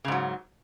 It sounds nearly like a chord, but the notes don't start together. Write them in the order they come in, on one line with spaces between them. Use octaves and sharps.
C#3 G#2 F#3